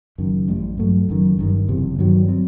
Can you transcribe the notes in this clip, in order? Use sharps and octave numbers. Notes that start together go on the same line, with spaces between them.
F#1 F#2 D#3
A1 A2 G3
G2 F#3 A3
F#1 F#2 D#3
G1 G2 D#3 G3
F#1 E2 C3
G2 D#3 F#3
F#3 C4